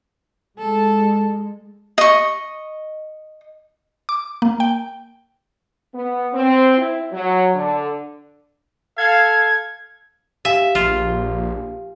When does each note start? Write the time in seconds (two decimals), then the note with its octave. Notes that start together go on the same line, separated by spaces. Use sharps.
0.59 G#3 A4
1.98 D#5 C#6
4.09 D6
4.42 A#3
4.60 G5
5.94 B3
6.34 C4
6.78 E4
7.12 F#3
7.54 D3
8.98 A4 F5 G#6
10.45 G4 E5 F5 G#5
10.75 A#1 F4